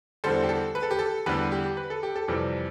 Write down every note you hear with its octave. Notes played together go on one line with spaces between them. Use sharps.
E2 D3 G3 A4 C5
G4
A4
B4
A4
G4
A4
E2 D3 G3 G4 B4
G4
B4
A4
G4
A4
F2 C3 E3 G3